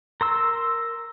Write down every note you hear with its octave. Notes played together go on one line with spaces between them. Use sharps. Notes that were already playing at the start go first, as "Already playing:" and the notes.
A#4 C6 E6